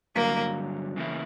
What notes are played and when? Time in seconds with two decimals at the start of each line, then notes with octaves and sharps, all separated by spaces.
0.16 G2 D3 F#3 A#3
0.96 C#3 E3 A#3 E4